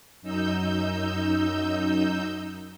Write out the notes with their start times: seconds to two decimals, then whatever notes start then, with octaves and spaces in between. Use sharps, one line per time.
0.22 F#2 D#4 E6 G6